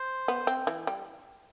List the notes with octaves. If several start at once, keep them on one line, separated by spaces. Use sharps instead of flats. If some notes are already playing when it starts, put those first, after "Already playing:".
Already playing: C5
B3
C4
E3
G3